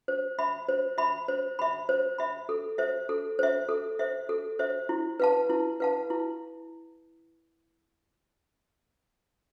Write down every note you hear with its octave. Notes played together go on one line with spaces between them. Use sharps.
C5
E5 B5
C5
E5 B5
C5
E5 B5
C5
E5 B5
A4
C5 E5
A4
C5 E5
A4
C5 E5
A4
C5 E5
E4
B4 F5 A5
E4
B4 F5 A5
E4